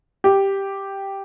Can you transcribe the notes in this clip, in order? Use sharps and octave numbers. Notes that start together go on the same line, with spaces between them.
G4